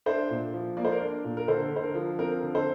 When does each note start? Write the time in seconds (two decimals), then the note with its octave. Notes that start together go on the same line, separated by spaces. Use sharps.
0.06 D4 C5 E5
0.30 A#2
0.54 F3
0.77 A#3 D5
0.85 C5
0.92 A#4 D5
1.01 D4
1.24 A#2
1.37 A#4
1.48 D3 A4 C5
1.72 D3 C5
1.83 A#4
1.95 F3
2.19 C4 A#4
2.43 D3
2.55 A4 C5